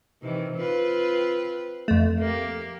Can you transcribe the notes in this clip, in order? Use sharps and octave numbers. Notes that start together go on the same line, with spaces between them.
C3 D#3 E3
C4 F4 B4
F2 A3
A#3 G4